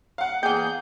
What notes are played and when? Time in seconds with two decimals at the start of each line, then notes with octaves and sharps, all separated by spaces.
0.18 F5 F#5
0.43 E2 A#3 G#4 G5 G#5 G6